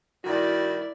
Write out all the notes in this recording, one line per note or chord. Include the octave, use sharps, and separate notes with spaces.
G2 D#3 E4 F#4 D5